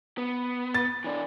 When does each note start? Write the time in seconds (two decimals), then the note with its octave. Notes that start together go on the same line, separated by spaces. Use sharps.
0.18 B3
0.75 A6
1.04 E3 D4